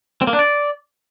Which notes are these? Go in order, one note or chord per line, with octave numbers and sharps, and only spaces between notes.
C4
A#3
D4
D5